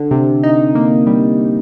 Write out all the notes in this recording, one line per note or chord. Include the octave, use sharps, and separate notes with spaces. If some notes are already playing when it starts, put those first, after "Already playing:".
Already playing: D3
C3
D#4
A#3
G3